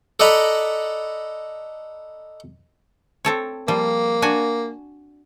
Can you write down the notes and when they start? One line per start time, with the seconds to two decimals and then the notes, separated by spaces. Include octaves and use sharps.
0.20 A4 D5 D#5 F#5 A#5 B5
3.25 C4 A4 C#5
3.68 F3 G3 A#3
4.22 D4 F#4 G#5